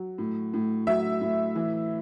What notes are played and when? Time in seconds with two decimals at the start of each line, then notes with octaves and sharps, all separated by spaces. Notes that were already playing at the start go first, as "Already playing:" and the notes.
Already playing: F#3
0.18 A2
0.54 A2
0.87 F#3 E5
1.21 A2
1.55 E3